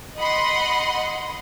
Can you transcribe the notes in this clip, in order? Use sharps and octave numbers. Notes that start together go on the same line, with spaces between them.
D#5 F#5 B5 C6